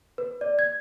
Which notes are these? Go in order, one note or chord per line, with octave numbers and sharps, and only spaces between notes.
B4
D5
G#6